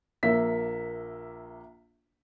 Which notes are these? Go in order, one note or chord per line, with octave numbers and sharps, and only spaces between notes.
A#1 A#3 E5 B6